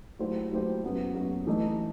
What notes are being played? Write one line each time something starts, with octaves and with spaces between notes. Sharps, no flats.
F#3 A3 E4 G4 C5
F#3 A3 E4 G4 C5
F#2 F#3 B3 F#4
F#2 F#3 B3 F#4
E3 A3 D#4